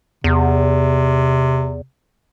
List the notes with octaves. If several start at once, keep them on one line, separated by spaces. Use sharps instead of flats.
E2 C3